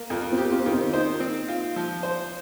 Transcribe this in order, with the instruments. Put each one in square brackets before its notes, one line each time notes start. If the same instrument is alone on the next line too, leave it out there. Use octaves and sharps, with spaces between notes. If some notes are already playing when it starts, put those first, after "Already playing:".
Already playing: [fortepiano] A#3
[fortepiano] F2 [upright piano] F4 A#4
[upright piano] C4 F4
[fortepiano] G4
[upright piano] C4 F4
[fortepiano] D#3
[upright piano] C4 F4
[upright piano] A#3 D#4 [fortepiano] C5
[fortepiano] C4
F4
F3
C5